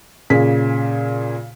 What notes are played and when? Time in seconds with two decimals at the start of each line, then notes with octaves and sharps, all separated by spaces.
0.30 A#2 C#3 G#4 B6